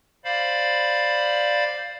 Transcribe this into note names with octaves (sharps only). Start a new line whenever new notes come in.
C5 D5 F5 B5